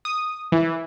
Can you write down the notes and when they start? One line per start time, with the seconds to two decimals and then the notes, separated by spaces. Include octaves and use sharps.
0.05 D#6
0.52 E3